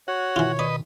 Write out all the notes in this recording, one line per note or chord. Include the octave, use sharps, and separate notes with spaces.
F#4 C#5
B2 D#3 E3 F4
B4 D5 D#5